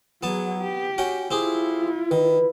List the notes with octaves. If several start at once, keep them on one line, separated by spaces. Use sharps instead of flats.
F#3 B3 G#4 A5
G4
C#4 F#4 G5
C4 E4 F4 G4 G#4
D#3 B4